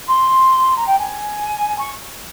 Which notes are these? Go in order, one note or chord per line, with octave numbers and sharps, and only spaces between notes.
C6
A#5
G5
G#5
C#6